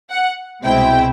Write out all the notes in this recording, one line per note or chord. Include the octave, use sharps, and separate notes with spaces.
F#5
C2 B2 G#3 C4 E4 G5